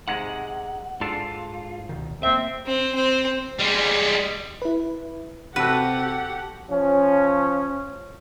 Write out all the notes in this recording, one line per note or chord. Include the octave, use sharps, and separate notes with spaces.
G#2 C3 G#3 F#5
G#2 D4 F4 A4
C#2 B2 D#3
D1 A#3 C4 E5
C4
C4
G3 G#3
E4 B4
C3 F#4 G4 A4 B4 F#5
F3 C#4